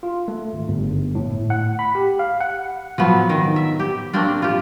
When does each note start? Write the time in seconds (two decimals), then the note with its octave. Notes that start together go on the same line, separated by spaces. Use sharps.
0.03 F4
0.28 A3
0.53 G#1
0.68 G1
1.15 A2
1.50 F#5
1.79 B5
1.95 G4
2.19 F5
2.41 F#5
2.98 F3 F#3 B3
3.29 D#3
3.56 E5
3.79 G4
4.13 A3 A#3 C4 D4
4.42 F4 G4